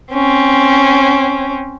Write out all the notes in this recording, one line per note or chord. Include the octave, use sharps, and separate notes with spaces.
C4 C#4